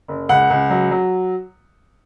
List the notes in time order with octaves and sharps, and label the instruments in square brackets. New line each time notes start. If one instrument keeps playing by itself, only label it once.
[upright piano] F#1
C#2 F#5
C#2
F#3
F#3